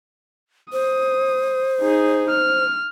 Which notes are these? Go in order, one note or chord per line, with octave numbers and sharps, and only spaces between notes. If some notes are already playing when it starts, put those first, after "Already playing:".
C5 D#6
D#4 G#4
F6